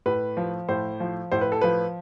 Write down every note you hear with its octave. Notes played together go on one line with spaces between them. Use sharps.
A2 B4
F3
A2 C5
F3
A2 C5
B4
A4
F3 B4